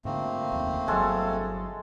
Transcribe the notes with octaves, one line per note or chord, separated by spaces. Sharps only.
G#2 D3 A3 A#3 C4
F1 D#2
G1 F#3 G#3 A4